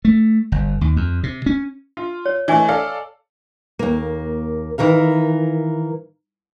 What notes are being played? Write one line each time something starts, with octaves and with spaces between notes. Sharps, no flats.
A3
G1
D#2
F2
C3
C#4
F4
C#5
E3 A3 D#5 G#5 C#6
A4 D5 F5
D#2 A#3
D#3 E3 A#4 F5